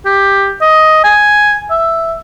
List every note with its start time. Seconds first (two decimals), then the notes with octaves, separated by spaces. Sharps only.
0.05 G4
0.61 D#5
1.04 G#5
1.70 E5